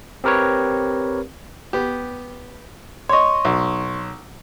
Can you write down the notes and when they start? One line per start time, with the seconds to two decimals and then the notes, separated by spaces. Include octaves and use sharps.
0.24 C4 G4 A#4 B4 C#5
1.73 B3 G4
3.09 C#5 D#5 C6 C#6
3.45 B1